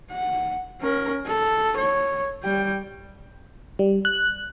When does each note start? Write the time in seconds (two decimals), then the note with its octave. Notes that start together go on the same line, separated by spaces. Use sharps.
0.11 F#5
0.81 C#4 A#4
1.27 A4
1.78 C#5
2.44 G3 G5
3.79 G3
4.05 F#6